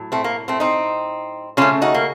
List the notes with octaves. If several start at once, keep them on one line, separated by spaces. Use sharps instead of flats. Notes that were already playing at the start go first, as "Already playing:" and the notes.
Already playing: A2 F#3
A3 C4
A#3
A3 C4
C4 D#4
C#3 A3 C#4 F4
D#4 F#4
A#3